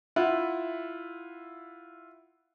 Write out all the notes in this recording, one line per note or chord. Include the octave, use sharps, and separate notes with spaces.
E4 F4 E5 F#5